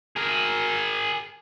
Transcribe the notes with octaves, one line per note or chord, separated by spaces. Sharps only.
G#4 A#4